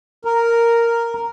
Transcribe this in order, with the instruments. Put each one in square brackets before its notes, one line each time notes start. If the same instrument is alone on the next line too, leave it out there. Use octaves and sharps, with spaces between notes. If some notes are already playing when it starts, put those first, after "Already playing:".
[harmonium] A#4